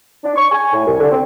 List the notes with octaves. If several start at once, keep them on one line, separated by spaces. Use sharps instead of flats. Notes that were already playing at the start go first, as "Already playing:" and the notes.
D4
C#6
G#5
A2
C2
D3
C4